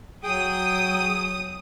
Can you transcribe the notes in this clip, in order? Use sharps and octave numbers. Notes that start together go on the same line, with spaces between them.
F#3 G#4 G5 D#6